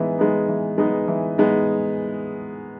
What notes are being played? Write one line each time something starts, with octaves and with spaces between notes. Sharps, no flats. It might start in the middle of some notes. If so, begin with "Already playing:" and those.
Already playing: E3 G#3 B3 D#4
G#3 B3 D#4
E3
G#3 B3 D#4
E3
G#3 B3 D#4